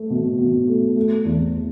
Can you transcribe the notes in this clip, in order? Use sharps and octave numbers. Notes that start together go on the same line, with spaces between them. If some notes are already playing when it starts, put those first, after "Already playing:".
Already playing: A3
B2
B2
A3
A3
E2